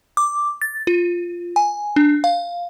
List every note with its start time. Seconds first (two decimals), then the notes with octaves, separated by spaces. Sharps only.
0.17 D6
0.62 A6
0.87 F4
1.56 G#5
1.96 D4
2.24 F5